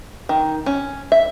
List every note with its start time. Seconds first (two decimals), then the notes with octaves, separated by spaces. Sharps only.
0.29 D#3
0.66 C#4
1.12 E5